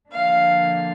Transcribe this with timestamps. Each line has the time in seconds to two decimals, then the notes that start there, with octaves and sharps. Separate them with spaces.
0.11 D3 F3 A#3 D4 F5